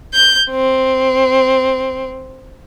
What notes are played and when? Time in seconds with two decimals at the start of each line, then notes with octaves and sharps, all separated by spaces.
0.14 G6
0.50 C4